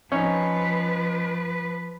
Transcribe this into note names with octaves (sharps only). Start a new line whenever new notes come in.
F3 C#4 D#4 B4